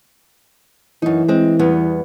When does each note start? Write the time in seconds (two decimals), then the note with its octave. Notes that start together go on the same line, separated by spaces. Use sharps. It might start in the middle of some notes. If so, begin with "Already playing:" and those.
1.02 F#2 E3 D#4
1.28 G#3 C4
1.59 E2 G3 B3